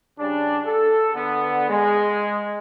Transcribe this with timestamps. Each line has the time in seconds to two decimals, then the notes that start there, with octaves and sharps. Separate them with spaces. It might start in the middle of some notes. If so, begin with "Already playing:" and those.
0.19 C#3 G3 D4
0.65 A4
1.14 D3 B3
1.69 G#3